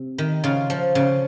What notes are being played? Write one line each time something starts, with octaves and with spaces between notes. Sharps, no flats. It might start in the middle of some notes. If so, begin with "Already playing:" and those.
Already playing: C3
D#3
C#3 F4
F3
C#3